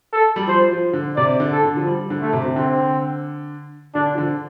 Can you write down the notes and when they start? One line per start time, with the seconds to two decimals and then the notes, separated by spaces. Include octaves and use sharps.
0.13 A4
0.36 G3
0.47 F3 C5
0.71 F3
0.93 D3
1.16 C3 D5
1.40 D3
1.52 A4
1.63 D3
1.76 F3
1.87 G3
2.10 D3
2.22 A3
2.33 C3
2.45 C3
2.56 D3 C4
3.95 D3 D4
4.15 F3
4.18 D3